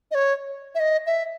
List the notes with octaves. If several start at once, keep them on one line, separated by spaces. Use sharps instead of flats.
D#5
C#5
E5
D#5
E5